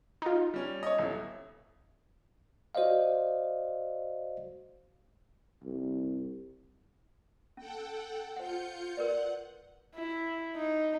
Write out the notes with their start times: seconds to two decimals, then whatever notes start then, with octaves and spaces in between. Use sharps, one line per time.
0.22 D#4 F4
0.54 G3 C#4
0.83 C#5 D#5
0.98 D#1 E4
2.75 F#4 C5 D5 D#5 F5
5.63 C2
7.57 C#4 A4 F#5 G5
8.37 F4 C5 F#5 G6 C#7
8.97 A#4 B4 D5 F#5
9.95 E4
10.56 D#4